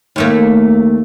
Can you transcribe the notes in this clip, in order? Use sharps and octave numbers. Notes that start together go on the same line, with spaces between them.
D#2 A3 A#3